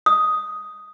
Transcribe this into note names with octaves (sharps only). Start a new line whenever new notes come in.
D#6